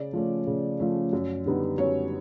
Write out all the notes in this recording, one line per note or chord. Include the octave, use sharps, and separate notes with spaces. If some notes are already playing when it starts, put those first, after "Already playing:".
Already playing: C#3 D5
F3 A3 C#4
C#3
F3 A3 C#4
F#2
D3 G3 B3 D#4
F#2 C#5